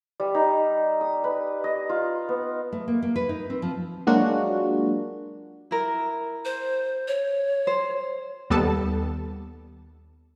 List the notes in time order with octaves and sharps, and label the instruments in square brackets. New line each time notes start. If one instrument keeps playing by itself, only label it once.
[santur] G3
D#4
D#6
B4
D#5
F4
B3
[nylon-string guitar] A3
A#3
A#3
B4
D#4
C4
F3
[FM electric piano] F#3 G#3 A#3 D4 F4 F#4
[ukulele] E4 A#4
[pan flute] C5
C#5
[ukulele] C5
[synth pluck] D#2 G3 B3 A4 A5